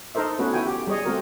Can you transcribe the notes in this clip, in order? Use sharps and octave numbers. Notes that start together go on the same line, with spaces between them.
D#4 A4 A#4 C5 E5
A3 B3 C#4 F#4 B4
E4 F#4 G5 G#5
G4
G3 G#4 C#5 D#5
A3 C4 F#4 A#4